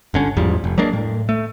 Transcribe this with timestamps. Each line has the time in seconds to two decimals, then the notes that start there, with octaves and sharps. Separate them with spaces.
0.14 G1 D3 C#4
0.37 E2 G#2 F3 G3
0.64 F1
0.78 F#3 G#3 A#3 D4
0.93 A2
1.29 A3